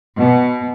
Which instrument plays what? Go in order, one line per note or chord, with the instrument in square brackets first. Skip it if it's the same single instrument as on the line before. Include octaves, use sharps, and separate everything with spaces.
[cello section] B2